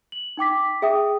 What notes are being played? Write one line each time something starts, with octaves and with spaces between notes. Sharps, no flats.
F#7
D#4 G5 D6 B6
G#4 E5 G5 D#6